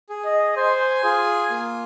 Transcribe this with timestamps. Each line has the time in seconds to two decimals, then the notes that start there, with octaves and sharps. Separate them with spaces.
0.10 G#4
0.25 D#5
0.57 C5 G#5
1.04 F4 G#4
1.50 A#3